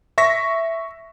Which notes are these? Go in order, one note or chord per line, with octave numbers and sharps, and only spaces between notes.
E5 C#6 A#6 B6